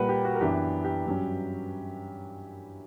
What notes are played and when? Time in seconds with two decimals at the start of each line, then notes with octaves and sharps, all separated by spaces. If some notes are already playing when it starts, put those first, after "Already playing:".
Already playing: A#2 G3 A#3 B4 F#5
0.09 G4
0.25 F#4
0.35 A#4
0.41 F#2 E3 B3 D4 G4
0.84 G4
1.05 G2 F#3 C#4